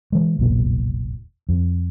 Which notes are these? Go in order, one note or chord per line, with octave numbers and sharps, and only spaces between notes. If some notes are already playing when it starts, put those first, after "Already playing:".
E3 G#3
F1 B1 E2 A#2
F2